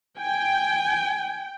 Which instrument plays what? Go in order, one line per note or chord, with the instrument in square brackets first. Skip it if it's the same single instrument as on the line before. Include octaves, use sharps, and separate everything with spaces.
[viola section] G5 [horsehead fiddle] G#5